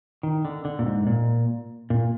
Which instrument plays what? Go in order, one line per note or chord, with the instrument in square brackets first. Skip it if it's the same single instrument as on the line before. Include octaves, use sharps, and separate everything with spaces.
[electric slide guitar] D#3
D3
D3
A#2
G#2
A#2
A#2